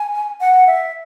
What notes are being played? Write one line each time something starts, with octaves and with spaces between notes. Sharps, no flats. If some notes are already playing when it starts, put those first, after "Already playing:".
Already playing: G#5
F#5
E5